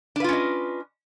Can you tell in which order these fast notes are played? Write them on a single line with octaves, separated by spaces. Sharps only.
D4 B4 F4 C#4 D#5